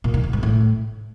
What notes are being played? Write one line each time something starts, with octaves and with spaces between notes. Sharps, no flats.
A#2
D#3
D3
G#2
A2